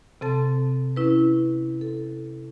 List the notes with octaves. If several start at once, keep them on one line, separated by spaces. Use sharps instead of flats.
C3 C4 A4 A5
C#4 E4 B4
A4